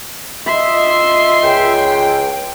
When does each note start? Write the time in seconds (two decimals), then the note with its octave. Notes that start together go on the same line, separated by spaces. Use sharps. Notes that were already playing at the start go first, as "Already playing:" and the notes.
0.47 F4 D#5 E5 C6
1.44 C#2 G5